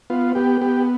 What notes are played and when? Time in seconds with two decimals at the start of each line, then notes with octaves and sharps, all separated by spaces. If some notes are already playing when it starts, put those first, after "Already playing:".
0.10 B3 F4
0.35 B3 G4
0.61 B3 G4